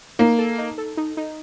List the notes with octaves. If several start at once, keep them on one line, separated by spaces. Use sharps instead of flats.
A#3 D#4
A4
D#4
A4
D#4
D#4